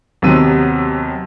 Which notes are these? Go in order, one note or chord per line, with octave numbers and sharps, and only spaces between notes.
D#2 C3 F#3 B3 E6 D#7